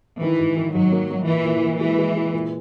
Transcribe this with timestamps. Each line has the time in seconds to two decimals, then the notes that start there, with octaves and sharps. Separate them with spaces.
0.21 D#3 E3
0.39 G#2
0.56 D#3
0.75 G#2 F#3
0.92 A#3
1.11 A#3
1.27 A#2 E3
1.45 A#2
1.63 A#2
1.80 E3 G#3
1.98 G#3
2.16 G#3
2.33 A#2